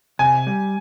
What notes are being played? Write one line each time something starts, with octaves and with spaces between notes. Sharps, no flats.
C3 G#5
G3